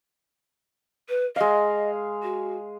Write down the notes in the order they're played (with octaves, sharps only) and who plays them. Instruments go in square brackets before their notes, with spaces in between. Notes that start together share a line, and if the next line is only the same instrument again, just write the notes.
[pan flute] B4
[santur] G#3 F5 [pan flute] D#5
[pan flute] F#4